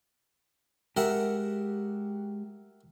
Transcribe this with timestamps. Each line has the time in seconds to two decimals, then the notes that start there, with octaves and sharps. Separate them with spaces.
0.97 G#3 F#4 G4 A#4 E5 F#5